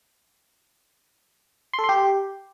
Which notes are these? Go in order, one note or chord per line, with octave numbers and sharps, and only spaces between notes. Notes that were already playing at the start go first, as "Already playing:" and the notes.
C6
A4
C6
G4